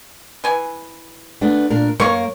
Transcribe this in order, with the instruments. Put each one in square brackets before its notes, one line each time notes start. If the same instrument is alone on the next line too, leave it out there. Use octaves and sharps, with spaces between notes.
[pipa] E3 G#5
[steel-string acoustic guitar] A3 B3 D4
A#2 D4 A#4
[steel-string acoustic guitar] F#2 A#3 A#4 [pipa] C#5 C#6